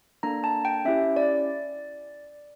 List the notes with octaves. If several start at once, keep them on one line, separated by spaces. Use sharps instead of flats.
A#3 D4 A4 A#5
A5
G5
C#4 E4 G4 E5
D5